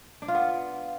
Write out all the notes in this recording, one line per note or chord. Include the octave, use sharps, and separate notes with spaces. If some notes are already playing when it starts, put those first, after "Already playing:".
D4
F4
B3